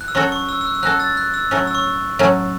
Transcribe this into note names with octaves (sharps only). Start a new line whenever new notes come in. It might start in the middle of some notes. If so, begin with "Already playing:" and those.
F#6
E6
F#3 C#4 F#4 A4 C#6
C#6
E6
E6
F#6
E6
F#3 C#4 F#4 A4 F#6
E6 A6
F#6
E6
A2 F#3 C#4 C#6
E6
C#6
A2 F#3 C#4